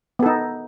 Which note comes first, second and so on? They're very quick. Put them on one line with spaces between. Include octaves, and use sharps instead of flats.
B3 A4 D#4